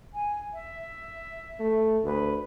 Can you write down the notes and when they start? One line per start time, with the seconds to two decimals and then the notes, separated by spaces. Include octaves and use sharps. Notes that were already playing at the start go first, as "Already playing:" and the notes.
0.14 G#5
0.53 E5
1.60 A3
2.04 D2 B4